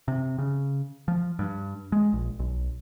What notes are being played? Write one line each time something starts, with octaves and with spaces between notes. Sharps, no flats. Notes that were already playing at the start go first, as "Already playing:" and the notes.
C3
C#3
F3
G2
G#3
A#1
B1